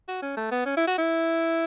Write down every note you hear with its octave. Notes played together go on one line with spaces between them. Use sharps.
F#4
C#4
A3
B3
C#4
E4
F#4
E4